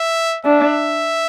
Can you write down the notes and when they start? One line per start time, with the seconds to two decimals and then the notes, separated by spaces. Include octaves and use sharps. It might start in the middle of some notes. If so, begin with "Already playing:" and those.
Already playing: E5
0.45 D4 E5